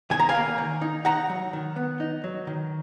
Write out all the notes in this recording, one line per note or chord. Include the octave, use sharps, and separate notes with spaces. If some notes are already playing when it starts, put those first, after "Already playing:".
D#3 G#5
A#5
F5 G#5
A#3
D#3
D#4
D#4 F#5 A#5
F#3
D#3
B3
D#4
F#3
D#3